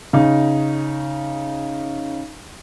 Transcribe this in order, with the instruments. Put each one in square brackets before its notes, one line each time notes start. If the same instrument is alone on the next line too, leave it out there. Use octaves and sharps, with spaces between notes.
[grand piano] C#3 D#4